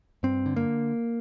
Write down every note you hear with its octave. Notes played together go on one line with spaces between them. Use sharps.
G2 C4
D3
A#3